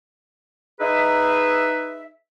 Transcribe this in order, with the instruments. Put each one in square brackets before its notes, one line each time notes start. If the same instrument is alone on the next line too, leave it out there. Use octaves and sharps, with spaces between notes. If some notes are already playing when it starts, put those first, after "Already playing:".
[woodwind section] D#4 G#4 B4 E5